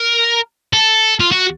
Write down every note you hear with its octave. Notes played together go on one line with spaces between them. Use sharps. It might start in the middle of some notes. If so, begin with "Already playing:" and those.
Already playing: A#4
A4
F4
F#4